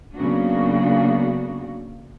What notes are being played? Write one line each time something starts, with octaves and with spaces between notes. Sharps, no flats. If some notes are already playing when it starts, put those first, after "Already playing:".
C#3 F#3 A#3 B3 D4 F#4